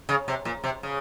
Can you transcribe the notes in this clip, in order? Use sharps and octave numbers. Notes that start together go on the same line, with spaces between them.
C#3
C3
A#2
C3
C#3